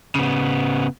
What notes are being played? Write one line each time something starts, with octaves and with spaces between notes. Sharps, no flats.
C#3 B3